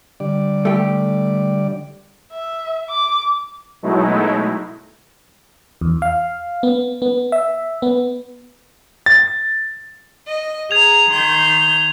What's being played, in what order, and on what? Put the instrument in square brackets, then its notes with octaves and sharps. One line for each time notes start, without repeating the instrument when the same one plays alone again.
[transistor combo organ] D3 G3 D5
[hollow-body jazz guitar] A3 G4
[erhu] E5
D6
[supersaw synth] B2 F#3 G#3 A3 D#4 E4
[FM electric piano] E2
F5
B3
B3
E5
B3
[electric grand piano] A6
[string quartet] D#5
[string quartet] G#4 A#5 [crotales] G#6 F7
[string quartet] D#3 C6 G6